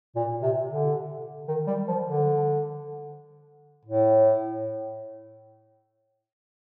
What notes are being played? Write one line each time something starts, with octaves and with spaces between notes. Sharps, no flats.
A#2
C3
D3
D#3
G3
F3
D3
A2